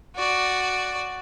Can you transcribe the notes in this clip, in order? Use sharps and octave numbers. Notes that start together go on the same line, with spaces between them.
F#4 D5